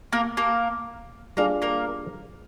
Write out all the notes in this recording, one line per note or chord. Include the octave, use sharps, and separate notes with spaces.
A#3 A#4
A#3 A#4
G3 A#3 D4 F4 G#4 A#4
A#3 A#4